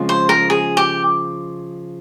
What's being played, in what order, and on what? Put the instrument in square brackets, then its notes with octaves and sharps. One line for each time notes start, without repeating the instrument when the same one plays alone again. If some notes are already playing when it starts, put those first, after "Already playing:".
Already playing: [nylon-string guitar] C#3 F3 G#3 C4
[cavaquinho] C5
A#4
G#4
G4